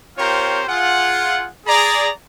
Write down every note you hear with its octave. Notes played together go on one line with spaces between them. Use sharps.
C4 F4 G4 A#4 C5 C#5
F4 G#4 F#5
G#4 D5 A#5